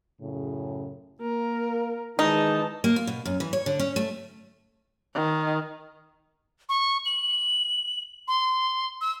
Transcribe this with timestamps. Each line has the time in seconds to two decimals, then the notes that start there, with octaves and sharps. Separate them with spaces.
0.21 F#2 A2 C#3
1.21 A#3 A#4
2.19 D#3 E3 G#3 D#4 A5
2.84 A#3
2.96 F4
3.07 B2
3.25 F#2
3.40 E3
3.53 C#5
3.66 D3
3.79 C#4
3.96 A3
5.15 D#3
6.69 C#6
7.06 F#7
8.28 C6
9.01 E6